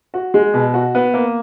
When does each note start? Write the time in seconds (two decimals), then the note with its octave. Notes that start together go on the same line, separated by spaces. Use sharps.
0.14 F#4
0.34 G#3
0.54 B2
0.74 F#4
0.95 B3
1.14 A#3